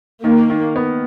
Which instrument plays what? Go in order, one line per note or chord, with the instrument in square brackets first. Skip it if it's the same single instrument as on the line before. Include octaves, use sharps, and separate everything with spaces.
[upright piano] D#3 [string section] A#3
[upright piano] D#3
B3